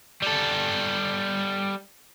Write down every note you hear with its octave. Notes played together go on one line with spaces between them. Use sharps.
G3 A4